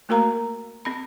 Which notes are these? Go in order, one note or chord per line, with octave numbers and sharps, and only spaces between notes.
A3 A#3 F#4 A#4 F5 A#5
C4 B5